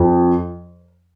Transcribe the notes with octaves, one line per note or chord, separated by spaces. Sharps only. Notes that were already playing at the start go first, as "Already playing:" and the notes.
Already playing: F2